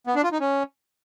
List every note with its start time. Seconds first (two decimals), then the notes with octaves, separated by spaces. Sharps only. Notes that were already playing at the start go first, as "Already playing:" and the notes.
0.07 B3
0.15 D4
0.24 F4
0.32 D#4
0.40 C#4